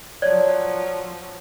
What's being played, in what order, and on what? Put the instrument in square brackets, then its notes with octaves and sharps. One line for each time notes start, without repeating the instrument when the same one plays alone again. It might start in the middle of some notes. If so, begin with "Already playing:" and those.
[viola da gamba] F3 F#3 [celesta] C#5 D5 G#6